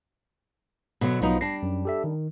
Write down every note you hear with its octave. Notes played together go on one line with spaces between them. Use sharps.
B2 D3 F#3
B1 F3 F#3 B3 D#4
G3 D4 A#6 C7
F#2
G4 A4 E5
D#3